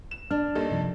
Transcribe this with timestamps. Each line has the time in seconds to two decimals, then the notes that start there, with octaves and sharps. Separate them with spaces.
0.11 E7
0.31 D4 F6
0.55 G2 A#3 D#4 G4 A4
0.70 F#2 C3 F3